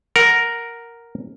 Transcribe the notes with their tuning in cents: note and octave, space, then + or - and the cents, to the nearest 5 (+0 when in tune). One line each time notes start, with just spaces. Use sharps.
A#4 +0 F#5 +0